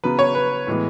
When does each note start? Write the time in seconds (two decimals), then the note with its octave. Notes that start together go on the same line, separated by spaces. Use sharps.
0.04 C#3 F#3 B3 B4
0.19 C#5
0.35 B4
0.67 A2 E3 G#3 B3